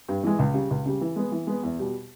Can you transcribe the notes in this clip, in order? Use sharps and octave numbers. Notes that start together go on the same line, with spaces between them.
G2
E3 G#3
C#2
C#3 G3
C#2
C#3 G3
E3
G#3 B3
E3
G#3 B3
E2
B2 G3